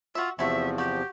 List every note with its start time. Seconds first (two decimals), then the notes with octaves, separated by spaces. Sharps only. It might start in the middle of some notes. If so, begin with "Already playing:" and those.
0.15 F4 F#4 E5
0.39 E2 C3 F3 A3 F#4 E5
0.78 F#4 G4